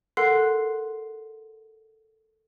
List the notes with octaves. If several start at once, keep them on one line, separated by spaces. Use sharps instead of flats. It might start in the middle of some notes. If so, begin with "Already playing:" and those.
A4 A#4 F#5 C6 F#6 C7